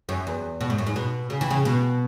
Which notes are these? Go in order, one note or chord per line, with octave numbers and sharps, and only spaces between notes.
F#2
E2
B2
G#2
F#2
G#2
B2
C#3
E3
C#3
B2